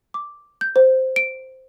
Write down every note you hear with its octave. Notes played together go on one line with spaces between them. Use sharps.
D6
G6
C5
D7